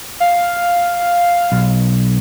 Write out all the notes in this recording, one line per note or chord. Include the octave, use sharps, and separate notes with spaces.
F5
B1